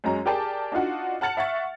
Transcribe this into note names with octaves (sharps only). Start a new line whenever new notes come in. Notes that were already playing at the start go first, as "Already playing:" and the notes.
F#2 G#3 C#4 A#5
G4 G#4 A#4 D5 G5 A5
D4 D#4 F4 F#4
F#5 A5 F6 A6 C#7 F#7
E5 F#5 C#6 A6